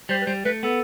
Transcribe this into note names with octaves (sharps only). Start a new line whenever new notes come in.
G3 C5
B4
G3 C5
A3 B4
B3 A4